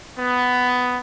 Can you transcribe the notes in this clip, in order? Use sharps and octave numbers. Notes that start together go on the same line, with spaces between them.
B3